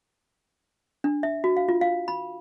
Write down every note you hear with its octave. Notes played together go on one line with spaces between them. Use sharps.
D4
E5
F#4
F5
F4
F5
B5